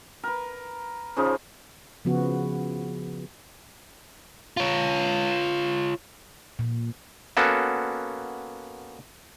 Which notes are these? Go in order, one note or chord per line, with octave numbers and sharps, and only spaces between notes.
A#4 B4
C#3 F3 D#4
C#3 F3 B3 F#4
F4 C#5
A#2
A#3 B3 C#4 F#4 A4